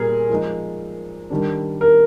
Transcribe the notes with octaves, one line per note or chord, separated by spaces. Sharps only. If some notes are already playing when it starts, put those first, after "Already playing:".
Already playing: A#2 G3 G#4 A#4
F3 G#3 D#4
D#3 G3 D4
A#4